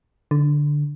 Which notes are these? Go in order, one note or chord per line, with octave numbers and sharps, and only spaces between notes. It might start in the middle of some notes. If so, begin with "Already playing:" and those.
D3